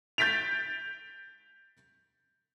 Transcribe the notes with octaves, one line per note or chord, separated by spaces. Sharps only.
G6 A6 B6 D7 F7